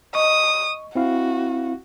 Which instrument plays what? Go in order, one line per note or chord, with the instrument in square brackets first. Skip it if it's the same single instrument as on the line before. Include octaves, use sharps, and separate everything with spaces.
[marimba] D#5 [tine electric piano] C#6 [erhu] D#6
[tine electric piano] C4 E4 F5 [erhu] F#4